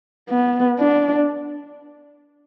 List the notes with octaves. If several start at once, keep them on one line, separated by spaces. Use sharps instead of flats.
B3
D4